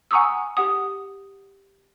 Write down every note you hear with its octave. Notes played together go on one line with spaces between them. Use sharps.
F#5 G#5 A#5 C#6 D#6 E6
G4 F#5 D#6